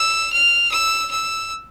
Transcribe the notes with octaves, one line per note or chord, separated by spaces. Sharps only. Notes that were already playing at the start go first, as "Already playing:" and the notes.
Already playing: E6
F6
E6
E6